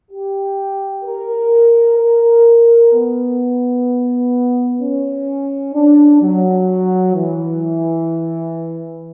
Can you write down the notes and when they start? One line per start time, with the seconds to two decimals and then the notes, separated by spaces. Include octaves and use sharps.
0.11 G4
1.05 A#4
1.99 A#4
2.93 B3
4.80 C#4
5.75 D4
6.22 F#3
7.15 E3